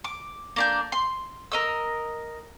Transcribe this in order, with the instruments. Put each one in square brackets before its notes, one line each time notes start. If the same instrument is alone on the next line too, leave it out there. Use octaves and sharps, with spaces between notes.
[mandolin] D6
A#3 D4 G6
C6
A#4 D#5 E6